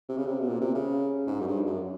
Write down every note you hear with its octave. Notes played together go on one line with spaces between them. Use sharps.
C3
C#3
C3
B2
A#2
C3
C#3
G#2
F#2
G2
F#2